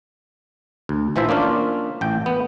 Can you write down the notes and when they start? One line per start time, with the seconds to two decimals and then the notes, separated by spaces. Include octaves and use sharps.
0.89 D2
1.16 A#1 E3 F3 E4 C5 E5
1.29 A#3 C#4 D4 F4
2.01 A1 G5
2.26 B3